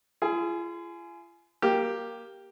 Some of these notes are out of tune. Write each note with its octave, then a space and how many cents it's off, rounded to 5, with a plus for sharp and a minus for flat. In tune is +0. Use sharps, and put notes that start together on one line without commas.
F4 -40 G#4 +15
A#3 +0 G4 +0